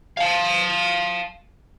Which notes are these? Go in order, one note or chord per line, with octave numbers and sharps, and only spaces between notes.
F5 A5